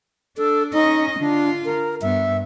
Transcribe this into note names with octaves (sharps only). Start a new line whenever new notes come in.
D4 A4
C#4 D#4 D#5
D3 D4 F4
A#4
G2 B3 E5